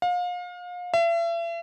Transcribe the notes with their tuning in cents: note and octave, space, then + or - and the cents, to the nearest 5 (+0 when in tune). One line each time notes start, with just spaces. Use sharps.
F5 +35
E5 +40